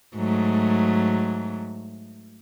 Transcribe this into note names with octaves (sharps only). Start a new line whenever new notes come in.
G#2 F#3 A3